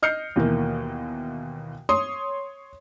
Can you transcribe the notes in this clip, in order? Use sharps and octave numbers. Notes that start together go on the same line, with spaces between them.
D#5 F6 G6 C7 C#7
D#2 B2 E3 A#3
C#5 C6 D#6